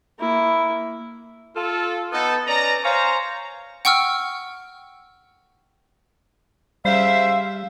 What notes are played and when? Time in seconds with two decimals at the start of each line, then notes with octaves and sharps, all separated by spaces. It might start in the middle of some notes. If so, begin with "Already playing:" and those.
0.19 A#3 E4
1.56 F4 A4
2.12 B3 D#4 A4
2.47 C#4 B4 D5 A#5
2.84 C5 C#5 F5 G#5 A#5
3.85 F#5 G5 C#6 E6 F6
6.85 C#3 G3 C5 E5 F5